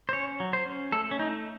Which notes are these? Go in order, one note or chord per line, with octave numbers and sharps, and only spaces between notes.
C5
C#4 C#5
F#3
C5
C#4
A3 A4
C#4
A3 D#4